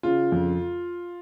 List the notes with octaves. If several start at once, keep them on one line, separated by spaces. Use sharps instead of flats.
C#3 F4
F2